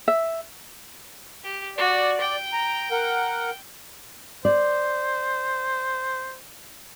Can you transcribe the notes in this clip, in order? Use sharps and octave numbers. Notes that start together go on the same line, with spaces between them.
E5
G4
F#4 D5
G5
A#5
A#4 F#5
C5 D5